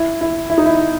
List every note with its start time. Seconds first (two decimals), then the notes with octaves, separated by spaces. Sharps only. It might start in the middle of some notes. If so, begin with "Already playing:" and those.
Already playing: E4
0.21 E4
0.50 E4
0.58 D#4
0.66 E4